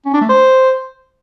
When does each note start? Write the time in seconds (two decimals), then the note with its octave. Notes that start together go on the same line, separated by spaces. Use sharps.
0.06 C#4
0.14 D4
0.21 A3
0.29 C5